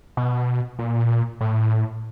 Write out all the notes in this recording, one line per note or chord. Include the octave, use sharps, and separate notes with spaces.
B2
A#2
A2